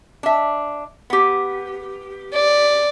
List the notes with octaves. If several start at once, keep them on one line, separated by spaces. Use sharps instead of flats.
D4 E5
B3 G4
D5